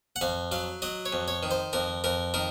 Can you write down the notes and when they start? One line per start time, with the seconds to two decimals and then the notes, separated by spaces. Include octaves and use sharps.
0.16 F#5
0.21 F2 F5
0.52 F#3 F5
0.82 F#3 D#5
1.06 C#5
1.13 F2
1.28 C#5
1.43 D#3
1.51 C5
1.73 F2 A#4
2.04 F2 A#4
2.34 D#3 A#4